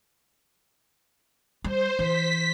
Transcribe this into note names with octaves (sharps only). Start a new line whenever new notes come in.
G3 C5
E3 B6